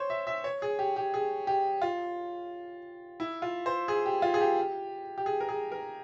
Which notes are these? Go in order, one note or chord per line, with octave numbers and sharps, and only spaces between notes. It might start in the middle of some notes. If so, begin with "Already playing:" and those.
Already playing: C5 C#5
E5
E5
C#5
G#4
G4
G4
G#4
G4
F4
E4
F4
C5
G#4
G4
F4
G#4
G4
G4
G#4
A#4
G#4
A#4